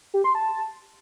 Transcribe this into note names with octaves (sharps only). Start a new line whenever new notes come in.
G4
C6
A5